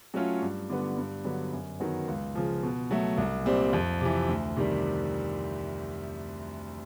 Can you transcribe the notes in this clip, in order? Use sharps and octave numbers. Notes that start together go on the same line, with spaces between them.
F#3 A3 C#4 F4
G2
D3 G3 B3
G2
D3 F#3 B3
F#2
D#3 F#3 B3
C#2
C#3 F3
B2
F#3 A3
C2
A#2 G3 C4
F2
C3 E3
D2
C3 D#3 G3